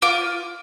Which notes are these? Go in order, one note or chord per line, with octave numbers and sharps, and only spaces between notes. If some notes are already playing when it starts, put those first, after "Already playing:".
F4 D6